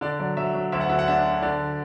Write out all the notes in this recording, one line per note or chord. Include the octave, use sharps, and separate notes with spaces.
D3 D5
F#3 D5
F#3 E5
F#3
D2 E5
F#5
D3 E5
F#5
D4 E5
D4
D3 D5